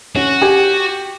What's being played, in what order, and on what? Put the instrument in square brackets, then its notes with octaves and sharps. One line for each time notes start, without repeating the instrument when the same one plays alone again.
[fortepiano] C#4 [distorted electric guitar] F#4
[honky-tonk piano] G4 [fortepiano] G#5